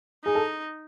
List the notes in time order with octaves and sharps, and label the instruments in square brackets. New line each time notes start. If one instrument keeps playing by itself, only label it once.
[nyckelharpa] D#4 [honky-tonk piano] G#4
[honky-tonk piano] A4